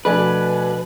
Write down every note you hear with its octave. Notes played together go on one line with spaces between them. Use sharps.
B2 F3 A3 D4 B4 D5 G#5